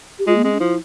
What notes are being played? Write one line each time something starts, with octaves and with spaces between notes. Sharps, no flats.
G4
G#3 F4
A#3
G#3 C4
C#4
F3 E4